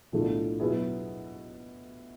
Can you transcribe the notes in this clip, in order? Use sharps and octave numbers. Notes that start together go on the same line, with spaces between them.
B1 A2 F3 A3 D4
B2 F#3 B3 E4 G#4